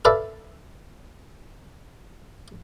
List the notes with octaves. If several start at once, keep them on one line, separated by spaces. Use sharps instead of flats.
A4 B4 D5 E5 F5 A5